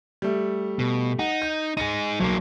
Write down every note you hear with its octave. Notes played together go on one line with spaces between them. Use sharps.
G3 A3
B2
D#4 F#5
G6
D#4 G#4 A#6 C#7 D#7
B1 F#3 A#3